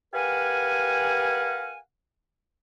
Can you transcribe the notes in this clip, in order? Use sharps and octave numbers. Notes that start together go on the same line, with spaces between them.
G4 A#4 B4 F5 F#5 G#5